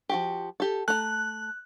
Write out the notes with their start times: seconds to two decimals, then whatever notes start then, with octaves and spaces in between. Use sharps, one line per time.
0.09 F3 F#4 G4
0.60 G4 A4
0.88 A3 A#5 F#6